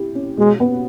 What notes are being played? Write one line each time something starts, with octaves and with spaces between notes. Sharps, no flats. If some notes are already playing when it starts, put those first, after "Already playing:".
Already playing: E4 G4
C#4
B2 G#3
B3